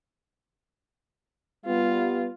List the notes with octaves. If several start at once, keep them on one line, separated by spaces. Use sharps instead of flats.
G3 B3 F4